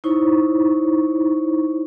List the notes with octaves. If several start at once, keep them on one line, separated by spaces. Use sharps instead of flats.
D#4 E4 C5 C#5 C#6